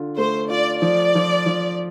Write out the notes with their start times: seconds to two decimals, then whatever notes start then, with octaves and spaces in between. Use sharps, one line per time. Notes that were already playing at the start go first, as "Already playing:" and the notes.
Already playing: D3 F4
0.17 A3 C5
0.50 F4 D5
0.82 F3 D5
1.15 F3
1.46 F3